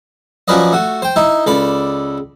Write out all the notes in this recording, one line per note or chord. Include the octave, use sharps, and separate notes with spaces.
F3 F#3 C#4 B4 D5 D#5
A3 F#4
C5 G5
D#4 E4 D#5
C#2 A4 D5 B5